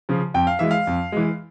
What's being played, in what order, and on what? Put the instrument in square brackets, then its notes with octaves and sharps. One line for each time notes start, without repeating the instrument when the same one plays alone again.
[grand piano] C#3 F3
F2 G5
F5
E3 G#3 E5
F5
F2
E3 G#3